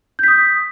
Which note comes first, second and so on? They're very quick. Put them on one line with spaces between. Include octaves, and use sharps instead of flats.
G6 B6 D#6